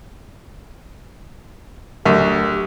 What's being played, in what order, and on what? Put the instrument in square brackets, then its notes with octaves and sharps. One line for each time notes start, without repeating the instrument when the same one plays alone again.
[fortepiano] D2 [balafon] F#3 [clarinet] G4 [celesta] A#4